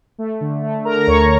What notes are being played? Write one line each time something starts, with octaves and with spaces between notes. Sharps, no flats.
A3
D3
A3
D3 A#4 A#5
A#5
D2 C#5 C#6